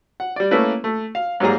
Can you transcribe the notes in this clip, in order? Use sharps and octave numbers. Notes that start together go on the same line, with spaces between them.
F#5
G3 D5
A3 A#3 C#4 E4 B4
A3
F5
G#2 F#3 G3 A#3 G#4 A#5